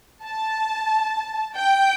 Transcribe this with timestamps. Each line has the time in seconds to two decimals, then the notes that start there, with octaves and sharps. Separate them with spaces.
0.23 A5
1.57 G5